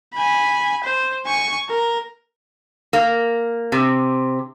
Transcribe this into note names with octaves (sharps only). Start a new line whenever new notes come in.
G#5 B5
C5
G#5 C#6
A#4
A#3
C3